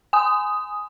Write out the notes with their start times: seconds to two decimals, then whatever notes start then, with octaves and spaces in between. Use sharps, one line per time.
0.13 G#5 D#6